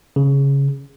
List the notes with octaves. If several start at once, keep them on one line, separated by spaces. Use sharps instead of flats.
C#3